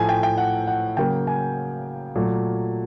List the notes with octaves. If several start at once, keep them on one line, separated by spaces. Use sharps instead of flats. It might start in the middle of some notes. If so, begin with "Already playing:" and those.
Already playing: A2 F3 A3 G#5
G5
G5
F#5
F#5
C#3 F#3 A#3 G5
G#5
A#2 F#3 A3